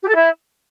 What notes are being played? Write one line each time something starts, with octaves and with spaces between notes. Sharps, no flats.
G4
A4
E4